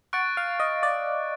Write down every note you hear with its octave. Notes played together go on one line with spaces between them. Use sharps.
F#5 C#6 F#6 A6 D7
F5
D#5
D5